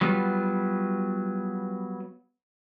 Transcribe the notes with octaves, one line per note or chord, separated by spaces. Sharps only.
F#3 G3 B3 F4